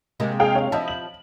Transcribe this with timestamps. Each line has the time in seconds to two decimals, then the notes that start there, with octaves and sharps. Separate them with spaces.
0.20 C3 G#3 A#3
0.40 G#4 F5 G5
0.55 C#5 F5
0.72 F3 E4 D#5 A5
0.88 F#7